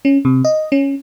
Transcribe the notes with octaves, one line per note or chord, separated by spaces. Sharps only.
C#4
C3
D#5
C#4